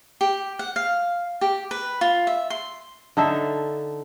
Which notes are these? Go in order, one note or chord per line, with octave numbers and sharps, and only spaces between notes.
G4
F#5
F5
G4
B4
F4
E5
C6
D3 D#4 A4 E5